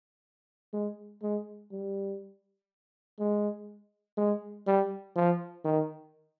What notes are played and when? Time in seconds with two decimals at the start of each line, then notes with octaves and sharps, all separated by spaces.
0.74 G#3
1.23 G#3
1.72 G3
3.19 G#3
4.18 G#3
4.67 G3
5.16 F3
5.65 D#3